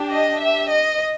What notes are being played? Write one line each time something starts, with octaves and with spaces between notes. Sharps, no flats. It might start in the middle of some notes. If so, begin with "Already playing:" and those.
Already playing: D4 G4
D#5
E5
D#5